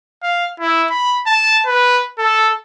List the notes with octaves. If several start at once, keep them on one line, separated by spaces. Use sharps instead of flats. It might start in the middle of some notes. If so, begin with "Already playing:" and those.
F5
E4
B5
A5
B4
A4